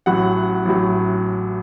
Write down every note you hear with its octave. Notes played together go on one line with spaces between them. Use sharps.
A1 A2 F#3 F#5
A1 A2 F#3